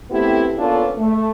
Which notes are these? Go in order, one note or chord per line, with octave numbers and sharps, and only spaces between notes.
A3 B3 C4 E4 G4
A#2 B3 C#4 D4 F4 A4
A3